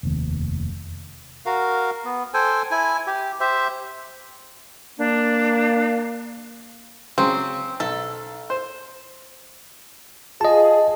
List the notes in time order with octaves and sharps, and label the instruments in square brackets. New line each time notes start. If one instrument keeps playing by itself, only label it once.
[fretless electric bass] F1 D#2
[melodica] F#4 A#4 F5
B3
A4 C5 G5 G#5
E4 G#5
G4
G4 C5 E5
[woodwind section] A#3 [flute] D4
[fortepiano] C#3 F#3 [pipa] C4
[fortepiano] B1 [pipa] A4
[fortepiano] C5
[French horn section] F4 G#4 [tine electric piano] D#5 A5